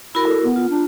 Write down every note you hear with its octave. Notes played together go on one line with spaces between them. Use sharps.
E4 F#4 A#4 B5
A4
B3
F4
D4